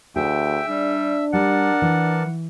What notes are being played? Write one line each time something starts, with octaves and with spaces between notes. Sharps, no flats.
D2 G#4 E5 G5
G3 D4
G3 A#4 D5 F#5 A5
E3